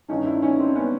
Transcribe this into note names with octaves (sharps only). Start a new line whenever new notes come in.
G2 D#3 C#4 D#4
D4 E4
C#4 D#4
C4 D4
B3 C#4